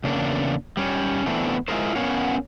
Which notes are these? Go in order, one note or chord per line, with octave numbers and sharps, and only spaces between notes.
E2 C#3 A#3 D4
G3 C#4
E3 A3 B3 C4 D4
G#3 E4 F4 G#4 A#4 C5
B3 C#4 A#4 C#5 F5 F#5